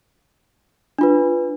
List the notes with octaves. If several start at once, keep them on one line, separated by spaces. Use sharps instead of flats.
D4 F4 B4